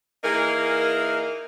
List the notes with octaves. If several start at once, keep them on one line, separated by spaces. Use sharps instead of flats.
E3 A#3 D#4 G#4 A#4